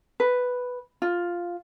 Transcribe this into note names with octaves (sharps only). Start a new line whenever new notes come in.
B4
F4